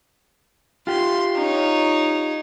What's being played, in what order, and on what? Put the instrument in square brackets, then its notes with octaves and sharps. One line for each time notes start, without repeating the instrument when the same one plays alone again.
[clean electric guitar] F4 G4 [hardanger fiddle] C6
[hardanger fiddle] D#4 C#5